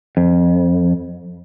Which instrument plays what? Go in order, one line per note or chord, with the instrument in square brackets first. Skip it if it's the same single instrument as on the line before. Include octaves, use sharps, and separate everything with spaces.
[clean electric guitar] F2